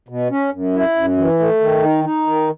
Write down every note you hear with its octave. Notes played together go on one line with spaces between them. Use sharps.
B2
C#4
F#2
E4
F#2
E3
A3
D#3
D#4
D#4
D#3